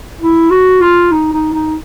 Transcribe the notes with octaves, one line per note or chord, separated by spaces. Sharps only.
E4
F#4
F4
D#4
D#4
D#4